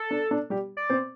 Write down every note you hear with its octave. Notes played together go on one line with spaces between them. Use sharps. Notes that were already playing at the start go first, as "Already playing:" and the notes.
Already playing: A4
D4
D4
G3 G4
D5
C4 C5